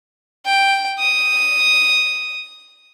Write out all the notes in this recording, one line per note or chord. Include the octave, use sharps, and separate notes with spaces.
G5
D#6